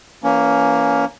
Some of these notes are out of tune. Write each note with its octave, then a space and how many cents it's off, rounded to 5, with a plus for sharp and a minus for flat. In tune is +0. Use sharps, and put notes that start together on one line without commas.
E3 +30 A#3 +0 C#4 +20